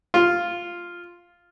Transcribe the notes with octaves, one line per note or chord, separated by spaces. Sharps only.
F4